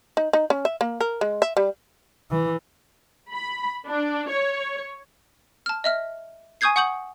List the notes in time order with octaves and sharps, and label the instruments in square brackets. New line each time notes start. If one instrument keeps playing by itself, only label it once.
[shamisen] D#4
D#4
C#4
E5
A#3
A#4
G#3
E5
G3
[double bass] E3
[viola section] B5
D4
C#5
[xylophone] A5 F6
D#5 E5 F6
G#5 C#6 D#6 G6 G#6 C7
F#5 C#6 D#6 G6 C#7 F#7